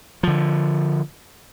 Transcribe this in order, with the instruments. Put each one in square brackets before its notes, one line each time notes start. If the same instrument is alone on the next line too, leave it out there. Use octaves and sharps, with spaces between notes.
[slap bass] D3 F3